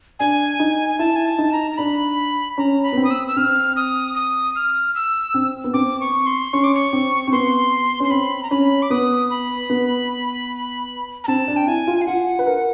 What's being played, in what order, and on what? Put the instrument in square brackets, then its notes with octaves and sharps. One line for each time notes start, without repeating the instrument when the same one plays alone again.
[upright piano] D4 [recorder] G#5
[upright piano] D#4
[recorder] G#5
[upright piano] E4 [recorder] A5
[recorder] G#5
A5
[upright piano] D#4
[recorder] A#5
A#5
[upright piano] D4 [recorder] B5
[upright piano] C#4 [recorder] A#5
[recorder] B5
[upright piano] B3
C4
[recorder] D#6
E6
E6
[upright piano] C4 [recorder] F6
[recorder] D#6
D#6
F6
E6
[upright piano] C4
B3
[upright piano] C4 [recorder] D6
[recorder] C#6
C6
[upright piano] C#4 [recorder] C#6
[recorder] D6
C#6
[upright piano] C4
C4
[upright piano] B3 [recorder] C6
[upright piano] C#4 [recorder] C6
[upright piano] C4 [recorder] B5
[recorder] A#5
[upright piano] C#4 [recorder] B5
[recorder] D6
[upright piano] B3 [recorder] D#6
[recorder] B5
[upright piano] B3
[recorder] A#5
[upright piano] C4 [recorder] A5
[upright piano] D4
[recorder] G5
[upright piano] E4 [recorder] G#5
[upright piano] F4
[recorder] F5
[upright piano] F4 [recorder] F#5
[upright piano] B4
A#4